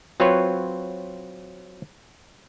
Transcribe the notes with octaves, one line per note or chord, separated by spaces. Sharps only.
F#3 C4 F4 B4 C#5